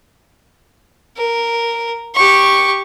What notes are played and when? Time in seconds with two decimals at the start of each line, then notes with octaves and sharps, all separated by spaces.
1.17 A#4
2.15 G4 C#6